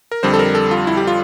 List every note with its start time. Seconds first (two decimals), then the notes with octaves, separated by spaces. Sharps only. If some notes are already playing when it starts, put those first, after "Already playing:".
0.12 A#4
0.23 F2 D3 G3 C5
0.34 A4
0.39 A#4
0.55 A4
0.71 F4
0.87 E4
0.97 G4
1.07 F4